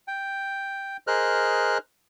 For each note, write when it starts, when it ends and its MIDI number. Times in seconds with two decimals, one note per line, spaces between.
0.08 0.97 79
1.07 1.78 68
1.07 1.78 70
1.07 1.78 72
1.07 1.78 75
1.07 1.78 89
1.07 1.78 90